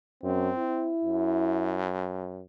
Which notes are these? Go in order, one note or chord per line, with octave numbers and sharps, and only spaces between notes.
F#2 C4
E4
F#2